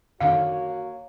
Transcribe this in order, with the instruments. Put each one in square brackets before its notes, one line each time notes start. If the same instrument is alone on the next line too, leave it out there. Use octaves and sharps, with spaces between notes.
[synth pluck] F#2 D3 D#3 [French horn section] A#3 F#4 C#5 [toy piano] F5